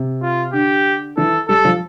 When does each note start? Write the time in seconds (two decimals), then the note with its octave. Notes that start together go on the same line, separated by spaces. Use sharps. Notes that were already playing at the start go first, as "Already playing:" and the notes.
Already playing: C3
0.22 F4
0.53 D3 G4
1.17 E3 A4
1.48 G3 A4
1.65 F3